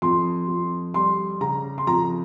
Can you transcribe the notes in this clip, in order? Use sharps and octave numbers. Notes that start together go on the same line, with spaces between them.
F2 C6
F2
G3 C6
C#3 A#5
C6
F2 A#5